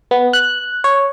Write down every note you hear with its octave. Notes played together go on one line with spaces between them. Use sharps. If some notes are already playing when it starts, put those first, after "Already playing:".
B3
F#6
C#5